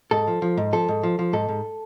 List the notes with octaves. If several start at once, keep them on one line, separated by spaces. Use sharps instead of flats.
G#2 A4
F3
F3
G#2
F3 A4
G#2
F3
F3
G#2 A4
G#2